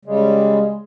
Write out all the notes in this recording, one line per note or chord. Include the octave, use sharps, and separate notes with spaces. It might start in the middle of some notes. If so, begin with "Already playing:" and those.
C#3 G3 G#3